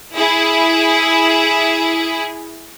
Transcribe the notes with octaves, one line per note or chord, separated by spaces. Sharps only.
E4 G#4